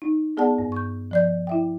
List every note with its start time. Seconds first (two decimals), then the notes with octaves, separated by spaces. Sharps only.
0.02 D#4
0.37 B3 G#4 D5 F#5 A5
0.58 G2
0.72 C#6 G6
1.11 F3 D5 G6
1.47 E4 E5 G5